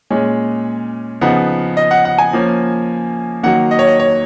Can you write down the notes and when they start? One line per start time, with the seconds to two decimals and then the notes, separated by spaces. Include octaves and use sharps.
0.10 A#2 G#3 C#4
1.21 C#3 F3 B3 D#4 F#5
1.77 D#5
1.91 F#5
2.05 F#5
2.18 G#5
2.33 F3 A#3 C#4
3.43 D#3 F#3 A#3 F#5
3.71 D#5
3.79 C#5
3.87 D#5
3.99 C#5